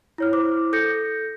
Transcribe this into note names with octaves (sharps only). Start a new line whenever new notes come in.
E4 C#5 F6
E4 C5 D6
A4 G6 A#6 C#7